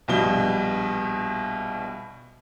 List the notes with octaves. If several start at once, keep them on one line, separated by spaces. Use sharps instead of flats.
A#1 G2 B2 G7